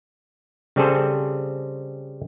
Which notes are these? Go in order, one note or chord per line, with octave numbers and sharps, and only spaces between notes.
C#3 G3 C4 G#4 A4 C5